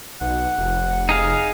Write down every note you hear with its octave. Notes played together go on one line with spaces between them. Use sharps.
B1 F#5
F1
D#4 G#4 F5